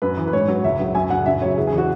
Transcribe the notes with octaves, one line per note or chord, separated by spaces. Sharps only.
F#2 B4
E3
B4
G#2 C#5
F#3
C#2 E5
C#3 F#3
F#2 G#5
C#3 F#3 F#5
F#2 E5
C#3 F#3 C#5
E2 G#4
G#4
E3
F#4